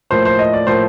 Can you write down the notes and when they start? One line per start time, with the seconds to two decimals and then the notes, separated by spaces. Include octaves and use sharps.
0.10 A2 F3 A#3 C5
0.25 C5
0.39 D#5
0.53 D5
0.67 A2 F3 A#3 C5